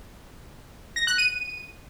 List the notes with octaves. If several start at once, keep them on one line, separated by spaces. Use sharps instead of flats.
A#6
F#6
D#7